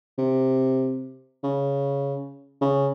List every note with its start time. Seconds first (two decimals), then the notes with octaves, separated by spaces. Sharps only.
0.18 C3
1.43 C#3
2.61 C#3